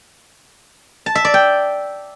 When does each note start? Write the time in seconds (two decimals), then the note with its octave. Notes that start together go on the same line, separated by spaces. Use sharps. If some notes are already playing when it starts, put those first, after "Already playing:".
1.06 A5
1.15 E5
1.25 D5
1.34 G5